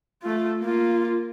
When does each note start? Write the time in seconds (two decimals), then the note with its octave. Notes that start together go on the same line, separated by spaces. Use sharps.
0.23 A3 F4
0.61 A#3 F4